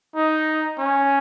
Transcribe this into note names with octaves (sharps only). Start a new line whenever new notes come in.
D#4
C#4